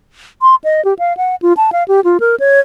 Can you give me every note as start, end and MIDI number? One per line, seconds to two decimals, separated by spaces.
0.42 0.55 84
0.64 0.84 75
0.85 0.94 67
0.99 1.16 77
1.17 1.35 78
1.42 1.53 65
1.57 1.70 81
1.72 1.84 77
1.88 2.00 67
2.04 2.18 65
2.20 2.35 70
2.40 2.60 73